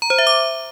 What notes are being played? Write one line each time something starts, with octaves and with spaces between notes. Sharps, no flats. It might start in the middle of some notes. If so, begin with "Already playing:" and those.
A#5
C5
E5
D6